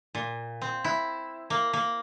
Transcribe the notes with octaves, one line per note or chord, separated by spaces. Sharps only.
A#2
C4
E4
A#3
A#3